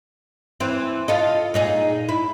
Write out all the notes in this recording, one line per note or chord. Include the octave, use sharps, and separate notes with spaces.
E3 C4
F4 A4 D#5
A#2 D#4 G#4
E4